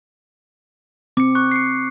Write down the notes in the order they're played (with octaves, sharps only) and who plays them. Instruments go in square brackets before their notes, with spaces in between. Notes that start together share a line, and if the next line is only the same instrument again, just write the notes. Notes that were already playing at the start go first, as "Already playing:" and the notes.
[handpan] C4 [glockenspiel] D6 C#7
[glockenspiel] C#6 F#6
C7 C#7